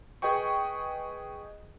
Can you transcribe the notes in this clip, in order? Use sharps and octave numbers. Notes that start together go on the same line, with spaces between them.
G#4 B4 D#5 G5 C#6